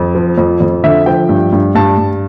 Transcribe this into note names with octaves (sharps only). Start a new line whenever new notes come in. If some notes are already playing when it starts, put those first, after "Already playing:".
Already playing: F2
F3
F2
F2
D3 E5
F3 G5
G2
G2
G2 A5
G2